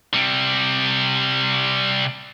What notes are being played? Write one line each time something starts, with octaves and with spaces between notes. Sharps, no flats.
C3 G3